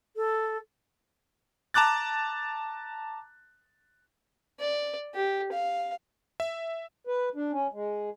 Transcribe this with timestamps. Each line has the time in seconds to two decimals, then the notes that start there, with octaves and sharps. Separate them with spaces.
0.16 A4
1.74 A5 A#5 D6 F#6 A6
4.60 D5
5.15 G4
5.52 F5
6.40 E5
7.07 B4
7.35 D4
7.52 C#4
7.73 G#3